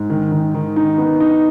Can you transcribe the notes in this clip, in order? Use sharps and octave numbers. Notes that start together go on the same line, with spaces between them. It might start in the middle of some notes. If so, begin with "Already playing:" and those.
Already playing: G#2
D#3
D#3
D#3
D#4
B3
D#4